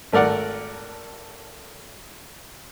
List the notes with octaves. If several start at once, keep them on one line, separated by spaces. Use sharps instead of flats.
G#1 A3 A#4 D5 F#5